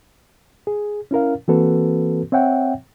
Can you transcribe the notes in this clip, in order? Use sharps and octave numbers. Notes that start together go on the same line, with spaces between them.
G#4
C#4 E4 A#4 F5
E3 A#3 C4 F#4 A4 B4
C4 C#5 E5 F#5 G5